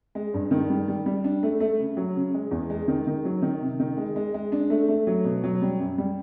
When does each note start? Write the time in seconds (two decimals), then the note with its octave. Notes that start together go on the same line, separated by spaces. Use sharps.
0.15 G#3
0.34 G2
0.51 D#3
0.70 G3
0.88 G3
1.06 G3
1.24 D4
1.43 A3
1.60 A3
1.80 C#3
1.97 F#3
2.16 C#3
2.34 G#3
2.51 E2
2.70 G#3
2.88 D#3
3.07 D#3
3.25 F#3
3.42 D#3
3.60 C3
3.80 D#3
3.97 G#3
4.16 G#3
4.34 G#3
4.52 D4
4.70 A3
4.88 A3
5.07 F#3
5.25 B2
5.44 F#3
5.62 G3
5.79 F#2
5.98 G3